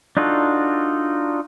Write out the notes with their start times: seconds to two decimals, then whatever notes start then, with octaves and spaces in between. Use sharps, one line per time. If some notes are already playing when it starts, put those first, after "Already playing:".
0.17 D4 D#4 F4 F#4 A4